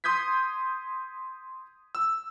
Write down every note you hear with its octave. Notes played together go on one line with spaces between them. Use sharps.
C6 D#6 G6 G#6 B6
E6